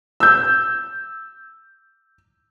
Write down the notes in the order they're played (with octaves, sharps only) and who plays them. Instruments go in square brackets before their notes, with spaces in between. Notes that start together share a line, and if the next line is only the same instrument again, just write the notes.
[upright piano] E6 G6